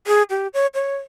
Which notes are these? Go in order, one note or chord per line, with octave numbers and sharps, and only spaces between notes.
G#4
G4
C#5
C#5